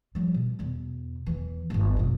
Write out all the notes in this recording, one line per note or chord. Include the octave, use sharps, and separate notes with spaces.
F3 G3
B2
E2 B2
E2 E3
D1 G1
F#2 B2